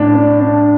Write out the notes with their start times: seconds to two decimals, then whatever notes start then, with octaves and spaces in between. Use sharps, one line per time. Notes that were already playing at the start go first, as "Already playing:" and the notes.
Already playing: A2 D4
0.14 D4
0.40 D4